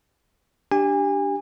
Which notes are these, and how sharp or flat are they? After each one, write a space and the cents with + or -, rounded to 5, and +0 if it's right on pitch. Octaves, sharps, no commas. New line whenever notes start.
D4 +0 G4 +0 G#5 -30